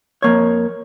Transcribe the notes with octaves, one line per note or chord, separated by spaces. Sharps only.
F2 A#3 C#5